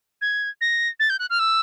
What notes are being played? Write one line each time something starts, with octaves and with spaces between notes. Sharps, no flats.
G#6
A#6
A6
G6
F#6
F6
E6